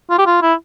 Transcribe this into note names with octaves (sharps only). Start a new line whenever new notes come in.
F4
G4
F4
E4